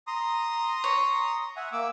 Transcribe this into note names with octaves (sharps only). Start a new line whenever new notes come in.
A#5 C6 D#6
C#5
E5 F#5 G#5
A#3 D6 E6